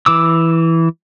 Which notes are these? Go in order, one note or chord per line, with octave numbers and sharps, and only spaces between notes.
E3 D6 E6